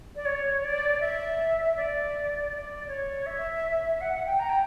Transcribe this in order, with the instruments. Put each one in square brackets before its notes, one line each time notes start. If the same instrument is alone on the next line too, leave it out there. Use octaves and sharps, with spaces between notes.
[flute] D5
C#5
D5
E5
D5
D5
C#5
E5
F#5
F#5
G5
A#5
G5